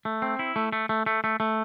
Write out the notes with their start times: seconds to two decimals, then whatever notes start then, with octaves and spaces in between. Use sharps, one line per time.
0.05 A3
0.22 C4
0.39 E4
0.56 A3
0.73 A3
0.89 A3
1.06 A3
1.24 A3
1.40 A3